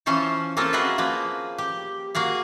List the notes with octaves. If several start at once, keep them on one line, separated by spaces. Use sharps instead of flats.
E3 F3 C#4 C5 C#5 A5
A#3 C4 C#4 F4 A4 A#4
F#4 G#4 B4 D#5 E5 G#5
F3 A#3 B4
G4
A#3 F#4 G#4 F5